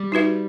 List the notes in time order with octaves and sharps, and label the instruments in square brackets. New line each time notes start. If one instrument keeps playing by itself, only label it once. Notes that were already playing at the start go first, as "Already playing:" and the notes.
Already playing: [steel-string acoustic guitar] G3
[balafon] D#4 F#4 B4 E5